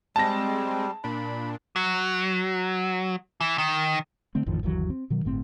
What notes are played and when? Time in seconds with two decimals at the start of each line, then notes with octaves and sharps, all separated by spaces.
0.16 G3 G#3 C4 A5 A#6
1.04 A#2 D4 B5
1.76 F#3
3.41 E3
3.58 D#3
4.35 D3 A3 C4
4.46 A1 F2 D#3 F3
4.63 G1 D#2 E3 F#3
4.90 C4
5.10 B2 D#3 F#3
5.25 G1 A2 C4